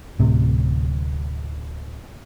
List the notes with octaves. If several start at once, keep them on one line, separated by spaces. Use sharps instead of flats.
D1 A2 C3